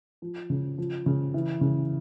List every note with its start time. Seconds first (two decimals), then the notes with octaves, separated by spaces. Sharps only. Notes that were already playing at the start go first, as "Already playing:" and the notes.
0.22 F3
0.50 C#3
0.78 F3
1.06 C#3
1.34 E3
1.61 C#3